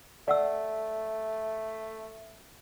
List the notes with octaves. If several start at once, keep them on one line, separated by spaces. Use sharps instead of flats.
A3 D5 F#5 E6